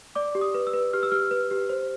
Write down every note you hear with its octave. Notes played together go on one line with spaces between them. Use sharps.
D5 D6
G4
D#6
B4
E6
B4
G4 F6
E6
G4 F6
B4
G4
C5